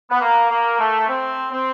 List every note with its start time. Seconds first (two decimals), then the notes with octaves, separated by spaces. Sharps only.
0.10 B3
0.20 A#3
0.49 A#3
0.79 A3
1.08 C4
1.51 C4